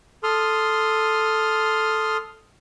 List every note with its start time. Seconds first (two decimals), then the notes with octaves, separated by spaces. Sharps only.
0.23 A4 C6 D#6 F6